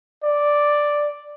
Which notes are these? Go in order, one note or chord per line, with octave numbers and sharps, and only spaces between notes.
D5